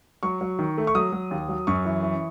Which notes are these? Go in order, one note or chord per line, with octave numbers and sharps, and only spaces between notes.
F#3 C#6
F#3
D#3
A3
C#6
F#3 D#6
F#3
D#2
F#3
F#2 C#6
E3
E3